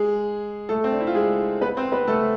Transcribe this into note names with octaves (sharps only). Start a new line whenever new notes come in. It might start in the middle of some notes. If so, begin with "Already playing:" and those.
Already playing: G#3 G#4
A3 A4
C4
D4
E4
F4
G#3 G#4
B3 B4
C4 C5
B3 B4
A3 A4